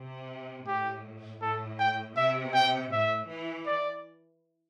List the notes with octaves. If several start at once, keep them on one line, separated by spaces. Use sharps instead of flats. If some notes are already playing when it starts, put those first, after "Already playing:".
Already playing: C3
A2 G4
A2 A4
G5
C3 E5
G5
A2 E5
E3
D5